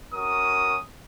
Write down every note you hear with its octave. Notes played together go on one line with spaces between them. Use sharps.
C#4 F#4 A#4 D#6